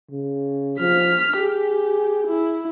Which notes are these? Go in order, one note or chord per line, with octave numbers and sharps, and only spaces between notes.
C#3
F3 F6 B6
G4 G#4
E4